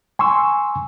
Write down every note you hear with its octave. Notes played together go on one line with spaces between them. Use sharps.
G#5 C6 C#6 E6